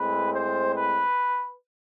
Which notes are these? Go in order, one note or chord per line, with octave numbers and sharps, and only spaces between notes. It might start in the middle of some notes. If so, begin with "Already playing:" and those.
Already playing: A2 G#3 C4 B4
C5
B4